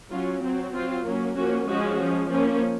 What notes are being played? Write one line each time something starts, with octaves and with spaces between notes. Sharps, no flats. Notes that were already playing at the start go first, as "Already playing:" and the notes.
F#3 C#4 F4
F#3 C4
F#3 C4 F4
F#3 A#3 C#4
F3 A#3 C#4 F#4
F3 G#3 C#4 F#4
F3 G#3 C#4
F3 A#3 C#4